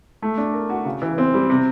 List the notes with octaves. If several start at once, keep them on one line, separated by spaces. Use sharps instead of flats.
A3
D4
A#4
F#4
C#3
E3
C4
G3
C3